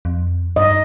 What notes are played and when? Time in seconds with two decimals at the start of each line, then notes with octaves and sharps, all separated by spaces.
0.05 F2
0.56 G2 D#5